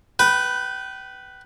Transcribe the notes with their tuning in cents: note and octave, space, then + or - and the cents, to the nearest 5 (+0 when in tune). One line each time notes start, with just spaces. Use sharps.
B4 +0 G5 -30